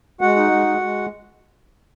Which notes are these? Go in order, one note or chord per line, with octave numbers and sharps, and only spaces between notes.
G#3 F#4 F#5
D#4
G#3
G#3
G#3